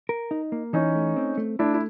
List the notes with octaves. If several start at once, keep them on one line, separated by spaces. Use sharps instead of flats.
A#4
D#4
A#3
E3 C#4 D#4
A3
C4
A3
A3 D4 E4
E4